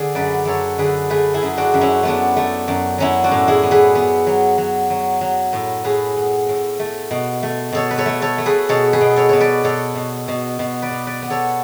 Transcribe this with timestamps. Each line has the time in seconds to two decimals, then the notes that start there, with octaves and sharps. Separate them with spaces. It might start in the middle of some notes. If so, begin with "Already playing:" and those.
Already playing: D3 G#4
0.15 F#2 B4 D5
0.45 F#2 A4 C#5
0.78 D3 G#4 B4
1.10 A3 G#4 B4
1.34 E4 G#4
1.42 F#2
1.57 D4 F#4
1.74 F#2
1.81 C#4 E4
2.03 A3 B3 D4
2.36 A3
2.68 F#2
2.98 F#3 C#4 E4
3.24 D4 F#4
3.31 A2
3.47 E4 G#4
3.63 B3
3.71 G#4 B4
3.95 B3
4.27 F#3
4.58 F#3
4.90 F#3
5.21 F#3
5.53 A2
5.84 A2 G#4 B4
6.16 B3
6.49 A2
6.79 A3
7.11 B2
7.43 A3
7.72 B2 A4 C#5
7.91 B4
7.98 A4 C#5
8.06 A3
8.22 A4 C#5
8.38 A3
8.46 G#4 B4
8.69 B2 A4 C#5
8.93 G#4 B4
9.01 B2
9.16 A4 C#5
9.29 B2 C#5
9.40 B4 D5
9.64 B2 A4 C#5
9.95 B2
10.28 B2
10.59 B2
10.82 B4 D5
10.91 B2
11.07 B4 D5
11.22 B3
11.30 A4 C#5